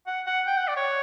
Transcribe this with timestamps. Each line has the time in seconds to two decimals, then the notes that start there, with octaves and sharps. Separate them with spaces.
0.07 F#5
0.27 F#5
0.47 G5
0.57 F#5
0.68 D5
0.76 C#5